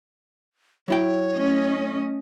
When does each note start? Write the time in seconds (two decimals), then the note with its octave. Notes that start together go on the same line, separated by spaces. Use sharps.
0.88 F#3 E4 C#5 G5
1.34 A3 C#4 D#5